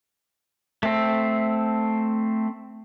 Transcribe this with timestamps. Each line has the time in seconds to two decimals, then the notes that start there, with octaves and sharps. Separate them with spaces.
0.83 A3 C4